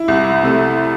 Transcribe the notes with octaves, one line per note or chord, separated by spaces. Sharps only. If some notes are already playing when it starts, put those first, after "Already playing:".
Already playing: E4
C2
C3 A3